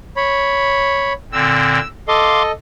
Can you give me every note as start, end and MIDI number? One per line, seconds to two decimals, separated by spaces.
0.16 1.13 73
0.16 1.13 83
1.32 1.79 46
1.32 1.79 50
1.32 1.79 60
1.32 1.88 88
2.08 2.52 69
2.08 2.52 75
2.08 2.43 77
2.08 2.43 84
2.08 2.43 86